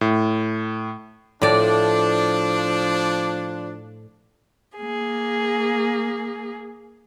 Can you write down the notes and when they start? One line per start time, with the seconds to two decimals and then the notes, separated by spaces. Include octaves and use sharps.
0.01 A2
1.42 A2 F3 D4 D5
4.79 A#3 G#4